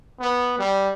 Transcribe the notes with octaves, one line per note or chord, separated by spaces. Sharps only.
B3
G3